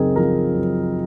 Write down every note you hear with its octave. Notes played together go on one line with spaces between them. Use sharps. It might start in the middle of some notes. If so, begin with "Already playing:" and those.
Already playing: F#2 C#3 C4 D#4 G#4 A#4 D#5
F3 A#4
F#2